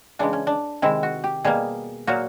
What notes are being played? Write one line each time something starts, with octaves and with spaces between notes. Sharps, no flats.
C#3 E3 G#3 D4
C#4
D4
C3 D#3 G#3 E4
F#4
G4
B2 G3 A#3 G#4
A#2 F#3 A#3 F#4